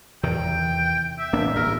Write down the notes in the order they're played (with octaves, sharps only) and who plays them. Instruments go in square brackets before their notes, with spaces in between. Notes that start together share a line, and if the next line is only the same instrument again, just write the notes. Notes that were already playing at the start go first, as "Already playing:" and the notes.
[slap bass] E2 C3 D#3 [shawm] G5
[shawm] E5
[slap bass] A1 A#3 D4
[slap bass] D1 G2 [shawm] A#4